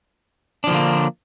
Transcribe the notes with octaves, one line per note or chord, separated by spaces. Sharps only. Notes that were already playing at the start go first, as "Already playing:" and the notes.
D3 F3 A#3 D4